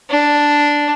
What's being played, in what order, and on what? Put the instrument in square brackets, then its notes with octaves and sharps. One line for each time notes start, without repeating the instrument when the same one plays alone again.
[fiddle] D4